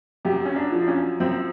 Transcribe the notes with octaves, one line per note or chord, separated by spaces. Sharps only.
F#2 G4
C#4
D4
F3
D4
C#4
F#2 C4